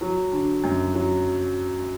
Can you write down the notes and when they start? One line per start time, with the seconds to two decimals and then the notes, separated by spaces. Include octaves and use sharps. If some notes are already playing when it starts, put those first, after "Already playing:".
0.01 F#3
0.32 D3
0.64 F#2
0.95 F#3